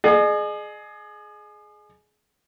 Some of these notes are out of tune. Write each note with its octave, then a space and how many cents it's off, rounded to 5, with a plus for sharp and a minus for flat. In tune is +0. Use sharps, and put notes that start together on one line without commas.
G#4 +20 D#5 -40